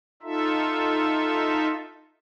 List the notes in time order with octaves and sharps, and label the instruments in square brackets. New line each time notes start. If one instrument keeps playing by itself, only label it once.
[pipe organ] D#4 F4 A4 E5